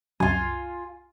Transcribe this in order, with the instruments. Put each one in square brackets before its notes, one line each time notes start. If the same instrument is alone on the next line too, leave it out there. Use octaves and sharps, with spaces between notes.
[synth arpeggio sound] C2 F#2 [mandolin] F4 G#5